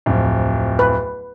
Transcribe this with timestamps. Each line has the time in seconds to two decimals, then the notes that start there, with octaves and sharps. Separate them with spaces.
0.06 D1 F2
0.79 B4